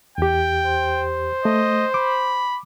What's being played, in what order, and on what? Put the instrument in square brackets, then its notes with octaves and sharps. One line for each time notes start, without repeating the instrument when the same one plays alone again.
[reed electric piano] E2 G4 [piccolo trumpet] G5
[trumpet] C5
[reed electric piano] A3 [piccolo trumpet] D#5
[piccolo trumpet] B5 [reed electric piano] D6